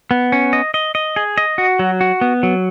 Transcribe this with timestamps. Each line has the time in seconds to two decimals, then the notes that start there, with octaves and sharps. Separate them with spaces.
0.11 B3
0.32 C#4
0.53 D#5
0.74 D#5
0.95 D#5
1.16 G#4
1.38 D#5
1.58 F#4
1.79 F#3
2.01 F#4
2.21 B3
2.43 F#3